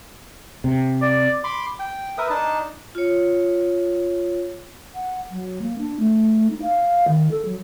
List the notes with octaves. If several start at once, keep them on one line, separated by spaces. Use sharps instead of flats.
C3
D5
B5 C6 D6
G5
A#4 B4 E5 D#6
D4 D#4 A5
F4 C#5
F#5
F#3
A#3
D4
A3
D#4
F5
D#3
A4
F#3